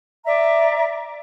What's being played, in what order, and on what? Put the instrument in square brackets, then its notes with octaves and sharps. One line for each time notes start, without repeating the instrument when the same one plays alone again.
[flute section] D5 E5 A#5